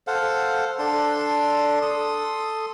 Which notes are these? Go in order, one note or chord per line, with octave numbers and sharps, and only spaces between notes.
A4 C5 F5 F#5
D4 A4 C6
A4 C6 D#6